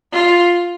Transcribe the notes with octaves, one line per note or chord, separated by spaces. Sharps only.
F4